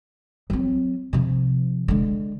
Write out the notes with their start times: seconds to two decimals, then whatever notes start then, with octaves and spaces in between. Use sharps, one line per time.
0.50 F#3 C4
1.13 C3 F3
1.88 D3 G#3